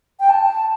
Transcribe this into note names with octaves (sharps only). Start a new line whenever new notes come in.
G5
A5